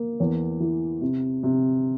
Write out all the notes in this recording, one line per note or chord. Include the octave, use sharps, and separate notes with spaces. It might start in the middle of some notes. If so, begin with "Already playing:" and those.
Already playing: A#3
E2
E3
C3
C3